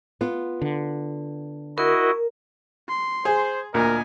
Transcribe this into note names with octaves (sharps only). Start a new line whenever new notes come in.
B3 F4
D3
E4 F#4 A#4 D#5
C6
G#4 C5
D2 A#2 A#4 D#5 G#5